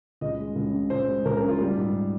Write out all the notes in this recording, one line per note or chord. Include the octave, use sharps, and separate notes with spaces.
C#2 D#5
G#3
C#2
C#3
C#2 C5
G#3
C#2 A#4
A#4
C#3
F4
G3
G#2